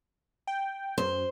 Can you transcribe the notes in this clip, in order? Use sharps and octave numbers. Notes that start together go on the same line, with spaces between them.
G5
F#2 C5